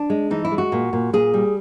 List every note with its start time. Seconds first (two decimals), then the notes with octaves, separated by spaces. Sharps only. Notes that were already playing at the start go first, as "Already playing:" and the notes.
Already playing: D4
0.10 G#3
0.30 E3 D#4
0.45 E4
0.51 G#3
0.58 F#4
0.72 A#2
0.93 A#2
1.13 A#2 G#4
1.34 G3